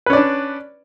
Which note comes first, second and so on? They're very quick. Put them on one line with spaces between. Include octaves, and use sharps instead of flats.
B4 C#4 D5 D4